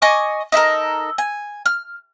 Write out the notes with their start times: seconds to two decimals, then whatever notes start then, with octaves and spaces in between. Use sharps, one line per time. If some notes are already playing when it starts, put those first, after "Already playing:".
0.02 D#5 G#5 C#6 D6
0.52 D#4 E4 A4 A#4
1.18 G#5
1.66 F6